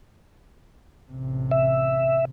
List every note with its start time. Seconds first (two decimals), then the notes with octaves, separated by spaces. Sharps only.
1.12 A1 C3
1.51 E5